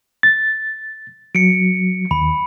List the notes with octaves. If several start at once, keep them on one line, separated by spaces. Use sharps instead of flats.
A6
F#3 C#7 D7
D#2 B5